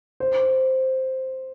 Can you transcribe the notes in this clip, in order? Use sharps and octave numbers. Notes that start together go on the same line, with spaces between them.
C5